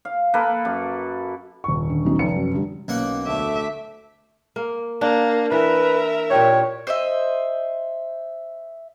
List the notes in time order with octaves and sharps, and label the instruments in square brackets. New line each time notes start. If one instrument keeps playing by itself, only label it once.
[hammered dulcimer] F5
A#3 A4 B4
F#2
[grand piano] D#1 C#6
[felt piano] D3
B1 C#3 D#4
[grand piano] F1 C#7
[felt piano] F#2
D3 G3
[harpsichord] B1 A#3 F#5 [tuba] C#4
[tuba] D2 [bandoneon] A3 D6 [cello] E5
[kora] A#3
[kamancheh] A#3 [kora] D4
[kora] E3 [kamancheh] A#4 E5 [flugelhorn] B4
[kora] A#2 G4 G5 [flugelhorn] C#5
[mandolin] C5 D#5 E5